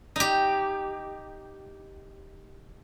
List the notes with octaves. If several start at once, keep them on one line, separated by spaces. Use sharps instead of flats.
D#4 G4